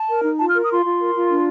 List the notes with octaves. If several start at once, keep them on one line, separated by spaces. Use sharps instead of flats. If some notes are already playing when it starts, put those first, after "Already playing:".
Already playing: A5
A#4
D#4
F4 A5
F6
A#4
D#6
F4 C6
F4
A#4
F4
D4